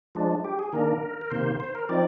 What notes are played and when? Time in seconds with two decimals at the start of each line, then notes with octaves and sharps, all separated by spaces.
0.15 F3 G#3 D4
0.44 G4
0.59 G#4
0.73 D#3 A#3 D4 A#4
1.21 A#4
1.30 C3 D#3 A#3 C5
1.60 C5
1.75 A#4
1.89 F3 C4 D#4 D5